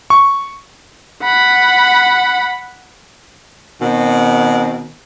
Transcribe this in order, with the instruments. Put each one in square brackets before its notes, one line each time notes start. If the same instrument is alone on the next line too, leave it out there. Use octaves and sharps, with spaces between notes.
[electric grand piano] C#6
[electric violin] F#5 B5
[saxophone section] B2 D#3 C4